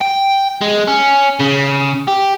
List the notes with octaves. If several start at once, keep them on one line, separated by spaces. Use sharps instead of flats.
G5
G#3
C#4
C#3
G4